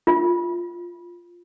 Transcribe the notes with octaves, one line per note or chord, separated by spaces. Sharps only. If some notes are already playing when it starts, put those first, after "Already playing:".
F4